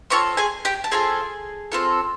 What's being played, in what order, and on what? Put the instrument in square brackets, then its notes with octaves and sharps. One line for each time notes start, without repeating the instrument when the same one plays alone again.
[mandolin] C4 F4 A4 C#5 C#6
G#4 G#5
G4 G5
A5
C4 F4 G#4 A4 G#5
C4 F4 A4